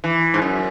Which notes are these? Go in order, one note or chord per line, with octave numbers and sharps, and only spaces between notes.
E3
G#2
F#2